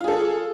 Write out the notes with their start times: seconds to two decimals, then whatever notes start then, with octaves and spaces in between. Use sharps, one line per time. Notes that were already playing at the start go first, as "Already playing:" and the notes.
0.01 F4
0.04 G#4
0.08 A4